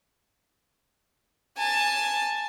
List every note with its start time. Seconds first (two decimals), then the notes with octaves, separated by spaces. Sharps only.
1.58 G#5 A5